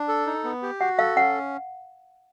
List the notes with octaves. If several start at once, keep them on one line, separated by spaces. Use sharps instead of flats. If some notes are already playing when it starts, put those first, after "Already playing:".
Already playing: D4
A4
D#4
B3
G4
F#4 F#5
A4 F5
C#4 F#5